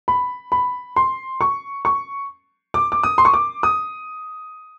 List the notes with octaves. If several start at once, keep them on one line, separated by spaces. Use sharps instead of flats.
B5
B5
C6
C#6
C#6
D6
D6
D#6
C6
C#6
D6
D#6